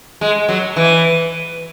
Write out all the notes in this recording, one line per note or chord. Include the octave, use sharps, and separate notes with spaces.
G#3
F#3
E3